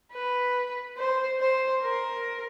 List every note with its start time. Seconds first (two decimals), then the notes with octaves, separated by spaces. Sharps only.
0.13 B4
0.98 C5
1.40 C5
1.83 A#4